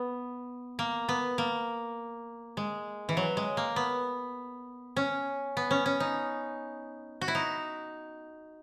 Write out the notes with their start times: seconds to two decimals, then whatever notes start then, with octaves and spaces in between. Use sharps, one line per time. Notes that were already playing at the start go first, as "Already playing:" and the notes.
Already playing: B3
0.79 A#3
1.09 B3
1.38 A#3
2.57 G#3
3.09 E3
3.17 F#3
3.37 G#3
3.57 A#3
3.76 B3
4.97 C#4
5.57 B3
5.71 C#4
5.86 C#4
6.00 D#4
7.21 F#4
7.28 E4
7.35 D#4